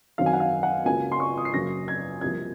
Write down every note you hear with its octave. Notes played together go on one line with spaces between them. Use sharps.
F#2 D#3 F#3 C4 F5
G#5
F#5
F5
F#5
C#2 C#3 F#3 A#3 G#5
C6
C#6
D#6
C7
F#2 C#3 F#3 A#3 A#6
G#6
C2 C3 F3 A#3 G#6